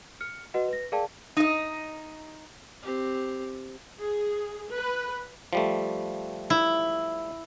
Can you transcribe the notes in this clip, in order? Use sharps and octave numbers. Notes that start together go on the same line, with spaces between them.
F6 C#7
F#4 B4 D#5 F#5
B4 A#6
G#4 A#4 D5 F5 G5 A5
D#4 D#5
C4 G4
G#4
B4
F3 G3 A3
E4